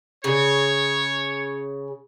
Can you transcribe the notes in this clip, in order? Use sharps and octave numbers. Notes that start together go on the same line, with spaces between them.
C#3 C#5